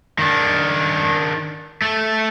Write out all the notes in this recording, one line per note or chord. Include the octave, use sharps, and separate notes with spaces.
D#3 D4
A3